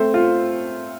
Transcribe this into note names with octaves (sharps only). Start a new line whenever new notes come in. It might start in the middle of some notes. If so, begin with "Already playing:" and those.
Already playing: A3 C4 C5
F4